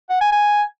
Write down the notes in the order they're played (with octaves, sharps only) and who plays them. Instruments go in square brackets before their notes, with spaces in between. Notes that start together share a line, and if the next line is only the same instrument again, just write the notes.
[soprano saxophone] F#5
G#5
G#5